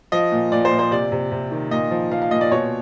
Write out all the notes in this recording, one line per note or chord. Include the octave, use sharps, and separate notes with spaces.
F3 D#5
A#2
A#2 D5
C5
A#2
C5
C3 D5
C3
C3
D#3
A#2 D#5
F3
F3 F5
F5
A#2 D#5
D5
B2 C#5